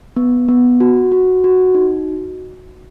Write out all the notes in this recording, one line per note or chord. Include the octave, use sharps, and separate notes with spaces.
B3
B3
F#4
F#4
F#4
D#4